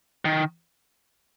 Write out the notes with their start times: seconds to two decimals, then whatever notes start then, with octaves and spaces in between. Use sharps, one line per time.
0.25 D#3